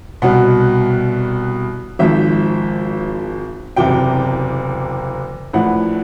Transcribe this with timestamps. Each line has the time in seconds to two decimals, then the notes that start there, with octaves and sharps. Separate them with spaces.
0.22 C2 B2 F#5
1.99 G#1 G#2 F3 E5
3.77 F#1 E2 C3 G5
5.53 A#1 A2 E3 F#5